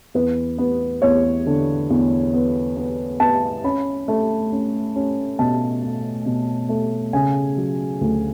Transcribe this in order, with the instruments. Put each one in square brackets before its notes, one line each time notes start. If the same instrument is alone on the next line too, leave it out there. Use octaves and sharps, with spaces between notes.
[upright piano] E2 B4
B3
E2 C#5
D3
E2
B3
B3
B3 A5
C#4 B5
A3
C#4
C#4
B2 A5
A3
B2
A3
C#3 G#5
F#3
D2